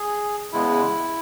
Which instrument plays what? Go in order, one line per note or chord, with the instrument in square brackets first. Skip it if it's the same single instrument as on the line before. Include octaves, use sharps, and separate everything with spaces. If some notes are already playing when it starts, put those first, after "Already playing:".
Already playing: [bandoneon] G#4
E2 C#3 G#3 B3 E4